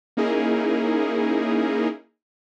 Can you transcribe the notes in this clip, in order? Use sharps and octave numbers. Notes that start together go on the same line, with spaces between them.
A#3 C#4 D#4 E4 G#4 A#4